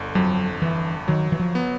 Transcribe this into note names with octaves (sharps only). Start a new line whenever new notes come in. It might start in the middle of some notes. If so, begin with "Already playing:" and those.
Already playing: G1 D3
F2 F#3
G1 E3
D#3 F#3
E3
F3
B3